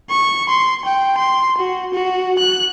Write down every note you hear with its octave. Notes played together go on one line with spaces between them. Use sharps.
C#6
C6
G5
C6
F#4
F#4
F#6